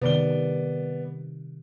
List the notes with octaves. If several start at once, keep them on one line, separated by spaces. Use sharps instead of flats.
C3 D#3 B3 D5 G7